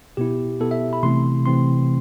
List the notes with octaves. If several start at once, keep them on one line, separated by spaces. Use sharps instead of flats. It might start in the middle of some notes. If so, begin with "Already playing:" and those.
B2 B3 E4 G4
B2 B3 E4 A4
E5
B5
C3 E3 A3 C4 E4 C6
C3 E3 A3 C4 E4 C6